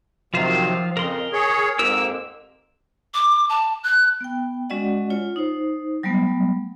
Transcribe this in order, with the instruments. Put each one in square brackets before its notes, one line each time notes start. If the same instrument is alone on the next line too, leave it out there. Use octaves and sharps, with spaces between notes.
[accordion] C3 D#3 F#3 [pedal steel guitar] F3 F4 C5
[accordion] F2 C#3 [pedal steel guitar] A#4 C6
[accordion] G#4 C#5
[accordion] F2 G#2 A#3 [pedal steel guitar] G4 A#4 E6
[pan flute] D6
A5
F#6
[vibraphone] B3 G5
G#3 C#4 F#4 D5 D#5 F#5
F4 C#5
D#4 C5
F#3 G3 A3 B3